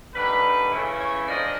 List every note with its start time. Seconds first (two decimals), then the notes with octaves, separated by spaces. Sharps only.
0.14 D3 G3 A#3 D#4 B4
0.71 C#3 E3 A3 C#4 E4
0.99 C#5
1.28 G#2 F3 A#3 D4 D#5